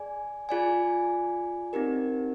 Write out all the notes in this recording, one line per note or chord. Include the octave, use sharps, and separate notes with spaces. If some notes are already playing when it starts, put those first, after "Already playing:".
Already playing: G#4 D5 G#5
F4 G#4 D5 G#5
C4 D#4 G4 A#4